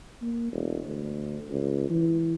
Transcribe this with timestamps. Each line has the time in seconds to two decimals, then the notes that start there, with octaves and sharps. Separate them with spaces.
0.22 A#3
0.52 E1
0.85 D2
1.50 C#2
1.90 E3